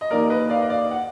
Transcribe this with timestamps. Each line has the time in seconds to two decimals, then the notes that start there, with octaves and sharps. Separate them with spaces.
0.01 D#5
0.10 D#2 D#3 A#3 A#4 D5
0.30 B4 D#5
0.50 D5 F5
0.61 D#5
0.69 D5 F5
0.91 F#5